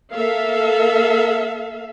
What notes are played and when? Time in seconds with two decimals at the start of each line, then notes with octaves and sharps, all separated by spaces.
0.14 A#3 A4 E5 F5